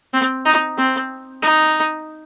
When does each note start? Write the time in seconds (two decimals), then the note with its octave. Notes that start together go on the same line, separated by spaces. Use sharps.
0.13 C4
0.46 D#4
0.78 C4
1.43 D#4